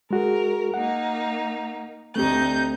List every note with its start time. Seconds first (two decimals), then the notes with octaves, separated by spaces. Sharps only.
0.11 G#3 F#4 G#4 A#4
0.74 A#3 D#4 F#5
2.16 D2 A3 C4 D#4 G4 G6